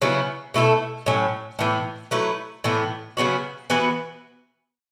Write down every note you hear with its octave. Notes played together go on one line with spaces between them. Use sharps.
C#3 F#3 B3 E4
B2 A3 E4 A4
A2 F#3 C#4
A2 E3 B3
F#3 A3 E4 B4
A2 E3 B3
C#3 F#3 B3 F#4
E3 B3 F#4 B4